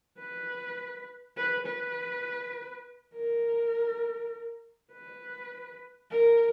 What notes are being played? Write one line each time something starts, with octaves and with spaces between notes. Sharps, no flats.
B4
B4
B4
A#4
B4
A#4